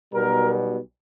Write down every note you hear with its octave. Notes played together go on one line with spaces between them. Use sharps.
B1 B2 G3 A#4